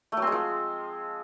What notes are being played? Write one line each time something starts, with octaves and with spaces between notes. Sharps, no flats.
A3
F#3
C4
G#3
F3